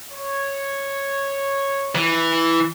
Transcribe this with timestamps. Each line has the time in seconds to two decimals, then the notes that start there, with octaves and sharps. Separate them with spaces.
0.12 C#5
1.95 E3